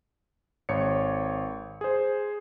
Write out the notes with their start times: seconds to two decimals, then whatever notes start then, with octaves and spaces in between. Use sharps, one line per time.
0.69 G#1 C#5 C#7
1.81 G#4 C5